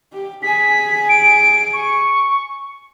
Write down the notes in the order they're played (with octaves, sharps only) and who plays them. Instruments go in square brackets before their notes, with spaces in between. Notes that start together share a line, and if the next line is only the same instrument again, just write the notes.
[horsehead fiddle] G4
[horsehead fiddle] G#4 G#5 [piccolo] B6
[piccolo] D7
C#6